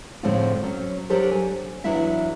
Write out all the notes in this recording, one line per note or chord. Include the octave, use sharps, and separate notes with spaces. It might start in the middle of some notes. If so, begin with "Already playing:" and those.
A2 D3 F3 G#3 C4 F4
F#3 C#4
F#3 D4 G4 A4 A#4 C5
G#5
E2 E3 F#3 D4 E4 E5